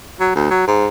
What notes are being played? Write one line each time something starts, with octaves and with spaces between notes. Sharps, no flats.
F#3
D2
F#3
G#2